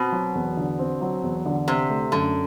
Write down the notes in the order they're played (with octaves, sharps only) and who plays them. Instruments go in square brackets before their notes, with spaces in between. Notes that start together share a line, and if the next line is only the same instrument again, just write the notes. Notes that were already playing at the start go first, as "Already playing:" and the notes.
Already playing: [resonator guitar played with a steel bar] B2 [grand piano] C4
[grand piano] F#3
E2
D3
C4
F#3
E2
D3
[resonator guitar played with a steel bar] C3 [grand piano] C4
[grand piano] A3
[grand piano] F#2 [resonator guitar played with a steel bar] D3